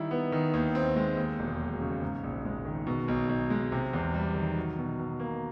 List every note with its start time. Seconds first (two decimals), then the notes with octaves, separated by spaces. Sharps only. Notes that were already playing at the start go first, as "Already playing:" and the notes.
Already playing: D#3 G3 E4
0.11 B3
0.32 D#3
0.53 D#2
0.75 C4
0.96 G#3
1.17 D#2
1.39 E1
1.60 F#3
1.81 C#3
2.02 G#2
2.23 A#1
2.45 G#3
2.65 D#3
2.87 B2
3.08 B1
3.29 B1
3.50 G#3
3.72 C3
3.93 E2
4.14 G3
4.35 D#3
4.57 F#3
4.78 B2
4.98 B2
5.20 A#3